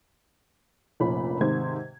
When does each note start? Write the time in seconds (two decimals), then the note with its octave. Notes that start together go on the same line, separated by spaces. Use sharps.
1.00 F1 A#1 A#2 C#4 B5
1.41 G#2 C3 D#3 C5 G#6